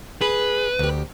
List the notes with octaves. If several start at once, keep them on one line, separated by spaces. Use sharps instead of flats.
G#4 B4
D2 G4